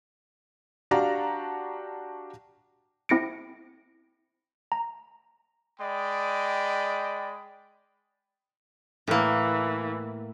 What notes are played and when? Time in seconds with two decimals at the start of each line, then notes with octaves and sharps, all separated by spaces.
0.91 D4 F#4 G4 F5 A5 A#5
3.09 C4 E4 A#6 C#7 D7
4.72 A#5
5.80 G#3 D5 D#5 G5 B5
9.07 A2 E3 A#3